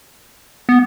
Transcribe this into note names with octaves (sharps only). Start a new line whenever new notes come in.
B3